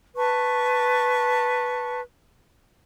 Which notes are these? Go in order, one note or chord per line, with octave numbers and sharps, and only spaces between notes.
B4 A5 C#6